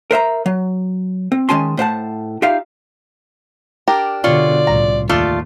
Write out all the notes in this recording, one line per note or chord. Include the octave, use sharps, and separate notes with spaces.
A#4 C5 E5 A#5
F#3
C4
D#3 G#3 C#4 G#5 A5 C6
A2 C5 F#5 A5
D#4 F4 G4 E5 F5
D4 G4 A#4
B2 D3 F4 C#5 D5
C2 A2 A#5
D#2 A3 F4 D5